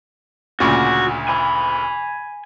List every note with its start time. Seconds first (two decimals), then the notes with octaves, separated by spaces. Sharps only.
0.60 D2 A#2 C#3 F#4
1.29 G#5 B5